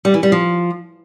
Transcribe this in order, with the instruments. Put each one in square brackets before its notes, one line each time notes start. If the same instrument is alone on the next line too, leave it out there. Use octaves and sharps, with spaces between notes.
[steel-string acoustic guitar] G3
E3
G3
F3